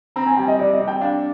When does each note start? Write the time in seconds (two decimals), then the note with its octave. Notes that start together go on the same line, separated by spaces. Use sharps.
0.16 C4 A#5
0.27 G#5
0.37 G3 G5
0.48 D#5
0.59 C3 D5
0.73 D#5
0.80 C3
0.88 G5
1.01 D4 F5